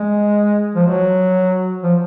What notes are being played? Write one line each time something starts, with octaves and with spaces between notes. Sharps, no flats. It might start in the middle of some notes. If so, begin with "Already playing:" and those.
Already playing: G#3
F3
F#3
F3